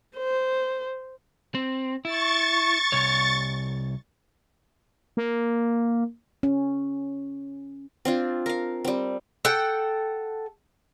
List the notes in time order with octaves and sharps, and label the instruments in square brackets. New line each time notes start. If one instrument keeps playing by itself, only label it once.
[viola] C5
[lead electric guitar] C4
[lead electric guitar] E4 [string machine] C#6 A6
[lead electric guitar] C2 C#5
[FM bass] A#3
[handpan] C#4
[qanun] C4 D4 F4
A#4 F5
G3 C4
[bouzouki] A4 F#5 G5